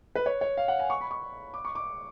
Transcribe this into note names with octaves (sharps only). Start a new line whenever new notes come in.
B4
C#5
C#5
F5
F#5
G#5
C#6
B5
C#6
D6
C#6
D6